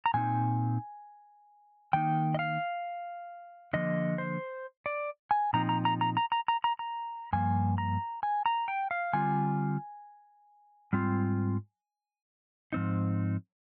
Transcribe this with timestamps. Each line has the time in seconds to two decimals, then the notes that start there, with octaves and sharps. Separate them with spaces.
0.06 A#5
0.14 A#2 F3 C4 D#4 G#5
1.93 D#3 A#3 D#4 G5
2.34 D#5
2.39 F5
3.73 D3 F3 A#3 D#5
4.18 C5
4.86 D5
5.31 G#5
5.53 A#2 F3 C4 D#4 A#5
5.69 A#5
5.85 A#5
6.01 A#5
6.17 A#5
6.32 A#5
6.48 A#5
6.64 A#5
6.79 A#5
7.33 G2 F3 A#3 G#5
7.78 A#5
8.23 G#5
8.46 A#5
8.68 G5
8.91 F5
9.13 D3 G3 C4 F4 G#5
10.93 G#2 G3 C4 F4
12.73 G#2 F3 C4 D#4